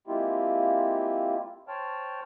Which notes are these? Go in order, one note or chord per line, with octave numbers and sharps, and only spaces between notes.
G#3 A#3 C4 E4 F4 G4
C5 C#5 G5 A5 F6